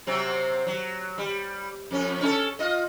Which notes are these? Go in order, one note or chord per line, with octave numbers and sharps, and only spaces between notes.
C3 F#3 C4
F#3
G3
F2 C#4
C#4 D#4 A4
F4 D#5